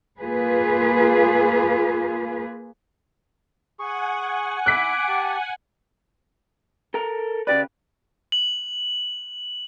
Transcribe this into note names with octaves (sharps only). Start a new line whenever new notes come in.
A#3 F4 G#4 B4
G#4 F#5 G#5 C#6
E4 D6 F#6 B6
G4 A5
A4 A#4 A#5
C#3 G4 B4 D5
F#7